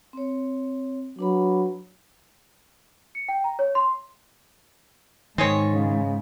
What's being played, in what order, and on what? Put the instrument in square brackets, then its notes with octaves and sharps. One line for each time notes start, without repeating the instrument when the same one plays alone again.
[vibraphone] C4 C#5
[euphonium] F#3 [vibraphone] D4 B4 B5
[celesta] C#7
G5
A#5
C#5
C6
[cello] G#2 [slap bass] D#3 [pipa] C4 G#4 C#5
[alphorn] C#3